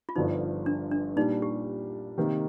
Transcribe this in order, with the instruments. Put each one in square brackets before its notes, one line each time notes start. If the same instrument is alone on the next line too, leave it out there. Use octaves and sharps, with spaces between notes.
[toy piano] F4
[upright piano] G1 G2 D3 F3 [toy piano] D#4
[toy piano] D4
D4
[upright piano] A#2 G3 D4 [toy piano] D#4
[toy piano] G4
[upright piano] C3 D#3 A#3